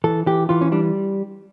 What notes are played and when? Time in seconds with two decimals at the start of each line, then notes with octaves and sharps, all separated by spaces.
0.04 E3 A4
0.26 E3 G4
0.49 E3 F4
0.61 C#4
0.72 G3 D4